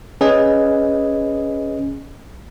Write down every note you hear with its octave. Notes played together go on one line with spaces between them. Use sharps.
C#4 G#4 B4 D#5 G#5